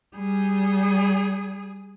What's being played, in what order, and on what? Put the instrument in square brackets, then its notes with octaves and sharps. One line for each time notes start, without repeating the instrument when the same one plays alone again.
[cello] G3 G#4